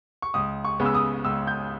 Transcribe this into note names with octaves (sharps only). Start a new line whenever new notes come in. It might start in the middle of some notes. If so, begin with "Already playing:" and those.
C#6
C#2 D#6
C#6
C#3 G#3 B3
E6
D#6
C#2 E6
G6